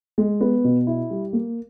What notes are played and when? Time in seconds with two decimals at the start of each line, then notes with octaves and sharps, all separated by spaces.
0.18 G#3
0.41 B3
0.64 B2
0.87 E4
1.11 G3
1.33 A#3